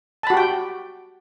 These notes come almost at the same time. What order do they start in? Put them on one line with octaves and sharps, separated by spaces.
A5 B5 F#4 G4 G5